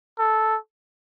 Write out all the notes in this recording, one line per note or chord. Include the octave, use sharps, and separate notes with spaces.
A4